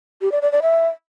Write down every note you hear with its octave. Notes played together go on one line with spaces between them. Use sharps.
G4
D5
D5
D5
E5